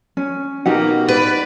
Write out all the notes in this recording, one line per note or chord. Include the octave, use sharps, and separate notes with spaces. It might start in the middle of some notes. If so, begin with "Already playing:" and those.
C#4
B2 A#3 D#4 G4 F#5
B4 D5 B5